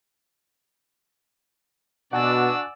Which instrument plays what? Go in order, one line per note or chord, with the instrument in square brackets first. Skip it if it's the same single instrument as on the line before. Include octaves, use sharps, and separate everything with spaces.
[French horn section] B2 [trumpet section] D4 F#4 [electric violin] D5 E6 [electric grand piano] F#5 G#5 A6